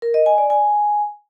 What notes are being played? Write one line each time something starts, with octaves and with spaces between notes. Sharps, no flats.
A#4
D#5
G#5
D5
G#5